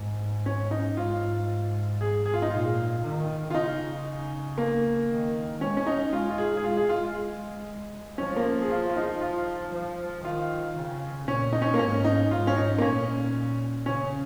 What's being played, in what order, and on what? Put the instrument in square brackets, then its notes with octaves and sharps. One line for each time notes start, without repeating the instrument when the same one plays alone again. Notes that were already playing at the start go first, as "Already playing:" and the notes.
Already playing: [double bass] G#2
[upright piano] C#4
D#4
[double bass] G#2 [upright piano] F4
[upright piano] G#4
G#4
F4
D#4
[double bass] A#2 [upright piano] F4
[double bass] D#3
[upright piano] F4
[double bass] C#3 [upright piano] D#4
[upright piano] A#3
[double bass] D#3
[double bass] G#3 [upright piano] C#4
[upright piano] C#4
D#4
[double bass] G#3 [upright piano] F4
[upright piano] F4
G#4
G#4
[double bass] G#3 [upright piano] F4
[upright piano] G#4
F4
[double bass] F3 [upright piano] C#4
[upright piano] A#3
G#4
F4
F4
D#4
F4
[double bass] F3
[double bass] D#3 [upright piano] F4
[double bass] C#3
[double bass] A#2 [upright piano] C#4
[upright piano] D#4
C#4
A#3
[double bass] G#2 [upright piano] C#4
[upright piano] D#4
[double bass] G#2 [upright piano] F4
[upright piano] C#4
D#4
A#3
[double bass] A#2 [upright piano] C#4
[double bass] C#3 [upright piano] C#4